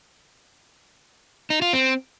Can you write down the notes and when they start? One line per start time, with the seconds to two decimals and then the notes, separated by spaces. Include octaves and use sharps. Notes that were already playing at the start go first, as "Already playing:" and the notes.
1.50 D#4
1.62 F4
1.73 C4